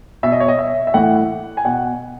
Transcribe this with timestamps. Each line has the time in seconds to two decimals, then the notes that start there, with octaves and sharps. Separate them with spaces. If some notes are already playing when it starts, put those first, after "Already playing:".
0.23 B2 E5
0.32 D#5
0.40 C#5
0.48 D#5
0.59 E5
0.87 E5
0.94 A2 E3 F#5
1.57 G#5
1.65 B2 F#5